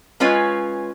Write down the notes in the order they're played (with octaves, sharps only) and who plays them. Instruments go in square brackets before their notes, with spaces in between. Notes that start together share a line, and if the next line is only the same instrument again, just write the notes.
[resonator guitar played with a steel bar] G#3 C#4 F4 B4 C#5